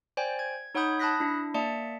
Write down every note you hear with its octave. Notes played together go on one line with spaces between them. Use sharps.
C5 D5 G5 G#5
G#6
D#4 C#5 F#5 B5 D#6 G6
A5 B5 D#6 F#6 A#6 B6
D4 E4
A#3 D5 E5 A5 C#7